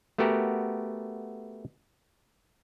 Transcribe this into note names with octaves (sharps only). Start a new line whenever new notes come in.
A3 B3 F#4 G4 A#4